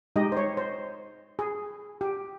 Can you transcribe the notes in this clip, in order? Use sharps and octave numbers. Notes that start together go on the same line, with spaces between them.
G#3 D#4 G4 D#5
C5
C#5
C5
G#4
G4